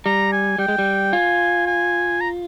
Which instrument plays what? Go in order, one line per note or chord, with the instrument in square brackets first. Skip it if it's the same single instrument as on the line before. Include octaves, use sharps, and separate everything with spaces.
[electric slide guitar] G3 [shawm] A#5
[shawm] G#5
[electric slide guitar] G3 [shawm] G5
[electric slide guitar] G#3
G3
[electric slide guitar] F4 [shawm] G#5
[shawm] G#5
A#5